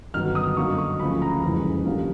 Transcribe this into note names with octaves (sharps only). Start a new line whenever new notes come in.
G1 G2 D#3 F#3 B3 F6
D#6
F#2 D3 F#3 A#3 D#4 C#6
C#6
D2 C#3 F3 B5
A#5
F#1 F2 C#3 E3 G#3
D3 G3 A#3